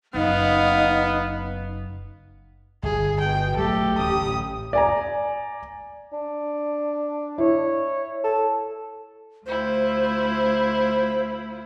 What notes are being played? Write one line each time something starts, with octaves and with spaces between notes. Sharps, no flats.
F#1 B3 D#4 F5
G1 G#4
B2 G5
A#1 F#3 A3 G4 A4
D1 A1 C#4 D#6
D5 G#5 A#5
D4
E4 C#5
A4
D2 E4 F4 C5